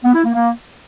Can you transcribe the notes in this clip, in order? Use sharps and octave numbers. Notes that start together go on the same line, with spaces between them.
B3
E4
A#3
A#3